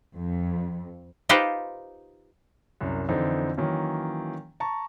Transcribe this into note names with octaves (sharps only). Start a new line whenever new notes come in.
F2
D#4 F4 G4 B4 C5
C2 F#2
F2 D3 E3 C4 D#4
D#3 E3 F#3 A#3 C#4
A5 A#5 C#6